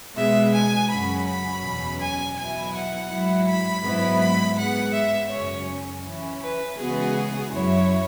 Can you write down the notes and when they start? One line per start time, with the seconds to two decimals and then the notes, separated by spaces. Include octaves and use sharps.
0.16 B2 G#3 B3 E5
0.53 G#5
0.89 F#2 C#3 F#3 C#4 F#4 B5
1.26 B5
1.63 E2 B2 F#3 C#4
1.99 G#5
2.36 B2 F#3 E4 G#5
2.73 F#5
3.09 G#2 F#3 E4
3.47 B5
3.83 G#2 F#3 B3 E4
4.20 B5
4.57 G#2 G#3 B3 F#5
4.93 E5
5.31 F#2 C#3 F#3 C#4 C#5
6.04 E3 C#4 E4
6.41 B4
6.78 C#3 E3 G#3 B3 F#4 G#4
7.51 F#2 F#3 E4 C#5